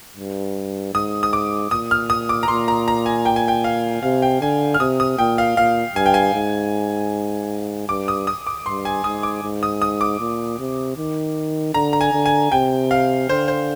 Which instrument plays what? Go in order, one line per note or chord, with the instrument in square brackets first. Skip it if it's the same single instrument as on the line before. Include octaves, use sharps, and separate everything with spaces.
[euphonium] G2
[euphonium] G#2 [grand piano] D#6
[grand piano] D#6
D6
[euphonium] A#2 [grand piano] D#6
[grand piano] F6
D#6
D6
A#5
[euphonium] A#2 [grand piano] C6
[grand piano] A#5
A#5
G#5
G5
G#5
G5
F5
[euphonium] C3 [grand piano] F5
[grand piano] G5
[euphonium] D3 [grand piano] G#5
[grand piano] F6
[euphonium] C3 [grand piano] D#6
[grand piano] D#6
[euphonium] A#2 [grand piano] G5
[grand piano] F5
[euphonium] A#2 [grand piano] F5
[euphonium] G2 [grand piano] G#5
[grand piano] G5
G#5
[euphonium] G#2
[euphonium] G2 [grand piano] D6
[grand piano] D#6
D#6
D6
[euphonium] G2 [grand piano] C6
[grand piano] G#5
[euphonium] G#2 [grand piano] D#6
[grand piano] D6
[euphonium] G#2
[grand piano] D#6
D#6
D6
[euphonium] A#2
C3
D#3
[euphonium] D3 [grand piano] A#5
[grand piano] A#5
G#5
[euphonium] D3
[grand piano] G#5
[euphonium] C3 [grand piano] G5
[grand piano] F5
[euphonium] D3 [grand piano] C5
[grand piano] C5